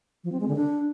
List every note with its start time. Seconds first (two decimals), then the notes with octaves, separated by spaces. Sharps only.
0.24 F3
0.32 C4
0.40 G#3
0.48 D3
0.56 D4